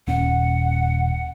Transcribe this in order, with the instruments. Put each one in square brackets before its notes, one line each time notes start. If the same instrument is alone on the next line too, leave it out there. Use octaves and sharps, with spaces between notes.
[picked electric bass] D#1 C#4 [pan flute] F#5